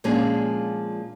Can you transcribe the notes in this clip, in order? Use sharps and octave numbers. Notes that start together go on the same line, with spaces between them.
A#2 F3 G#3 C#4 D4 G#4